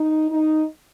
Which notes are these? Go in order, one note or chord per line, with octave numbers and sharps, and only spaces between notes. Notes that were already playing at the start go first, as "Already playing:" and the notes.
Already playing: D#4
D#4